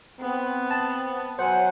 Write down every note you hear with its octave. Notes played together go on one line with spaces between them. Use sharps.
B3 C4
A5
F#3 C5 C#5 F#5 G#5